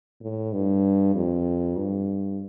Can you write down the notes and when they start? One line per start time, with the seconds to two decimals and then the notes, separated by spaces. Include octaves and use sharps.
0.21 A2
0.53 G2
1.14 F2
1.76 G2